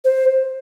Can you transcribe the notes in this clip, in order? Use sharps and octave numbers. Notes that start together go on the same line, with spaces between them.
C5